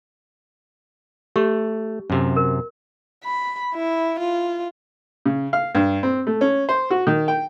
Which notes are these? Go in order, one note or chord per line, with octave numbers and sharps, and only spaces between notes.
A3 G4 C#6
F#2 C3
A#4
B5
E4
F4
C#3
F5
G2
C4
A3
C#4
C5
F#4
D#3
G5